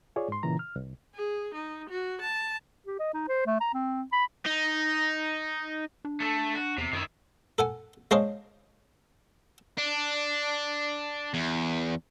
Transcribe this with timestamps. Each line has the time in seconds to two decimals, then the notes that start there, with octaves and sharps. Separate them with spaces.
0.16 F4 G#4 C#5 D5
0.28 G#2 C6
0.43 A#2 C#3 E3 A#5
0.59 F6
0.76 C2
1.15 G#4
1.54 D#4
1.89 F#4
2.21 A5
2.87 G4
2.99 D#5
3.13 D#4
3.28 C5
3.46 A3
3.61 A#5
3.74 C4
4.12 B5
4.46 D#4
6.05 D4
6.20 A3 A4
6.55 F#4
6.78 E2 C3
6.93 F#2 D#3 E4
7.58 A4 F#5 G#5
8.11 G#3 D4 C5 C#5 D#5 F5
9.78 D4
11.34 E2